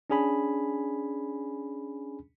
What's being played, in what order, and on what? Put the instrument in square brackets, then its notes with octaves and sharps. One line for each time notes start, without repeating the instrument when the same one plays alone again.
[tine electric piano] C#4 D4 G#4 G#5 B5